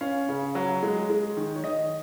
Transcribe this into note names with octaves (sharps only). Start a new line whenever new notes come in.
C#4 F5
C#3
F#3
G#3
G#3
D#3
C#5
D#3 D#5